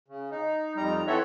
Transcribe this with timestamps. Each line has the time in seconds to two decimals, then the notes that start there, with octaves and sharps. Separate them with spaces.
0.08 C#3
0.31 D#4
0.77 F2 G3 D#4 A#5
1.08 E3 C4 A4 C#5 E5 F#5